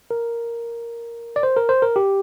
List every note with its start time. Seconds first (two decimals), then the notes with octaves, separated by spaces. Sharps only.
0.11 A#4
1.36 D5
1.43 C5
1.56 A#4
1.69 C5
1.82 A#4
1.96 G4